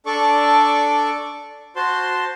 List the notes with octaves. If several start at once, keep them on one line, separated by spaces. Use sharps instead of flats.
D4 A4 D5 C#6 D6
F#4 C5 A5 C6